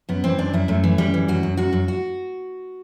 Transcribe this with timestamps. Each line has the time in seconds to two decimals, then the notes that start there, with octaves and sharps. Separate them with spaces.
0.09 F#2 B3
0.24 E3 C4
0.38 F#2 D4
0.53 F#2 E4
0.68 F#2 A3
0.84 E3
0.98 F#2 G3
1.14 E3
1.28 F#2 F#4
1.43 F#2
1.57 F#2 F#4
1.73 F#2
1.88 F#4